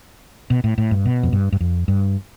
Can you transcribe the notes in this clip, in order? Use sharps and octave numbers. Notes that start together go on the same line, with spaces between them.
B2
A2
A2
G2
B2
F2
G2
G2
F2
G2